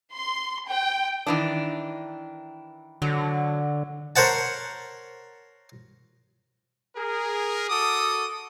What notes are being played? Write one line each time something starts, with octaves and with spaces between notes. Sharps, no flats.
C6
G5
D#3 E3 D4
D3 F#3
A#4 C5 C#5 F#5 A5
G#4 A#4
F#4 A4 D6 D#6